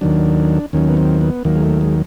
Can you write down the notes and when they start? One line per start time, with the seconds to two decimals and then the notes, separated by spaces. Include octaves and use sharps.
0.01 D#2 D#3 F#3 D4
0.73 D#2 D#3 F#3 C#4
0.88 B3
0.97 C4
1.21 B3
1.45 D#2 D#3 F#3 A#3
1.56 G#3
1.62 A3
1.81 G#3